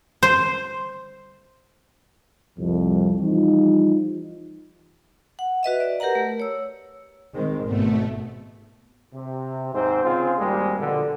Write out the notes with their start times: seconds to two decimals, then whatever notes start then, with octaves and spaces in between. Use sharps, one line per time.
0.23 C5
2.59 C2 F2
3.21 E3 F3 G3 D#4 F4
5.39 F#5
5.63 F#4 B4 D#5 E5
5.80 D5
6.00 G4 A#4 B4 F#5 A#5
6.15 A3
6.40 C#5 E6
7.33 D#3 G#3 C4
7.65 G#1 B2 A3
9.14 C3
9.73 D#2 G#2 C4 C5
10.04 C#3 C4 F4 G#4
10.39 G#1 G3 G#3 A#3 C4
10.79 A#1 B2 D3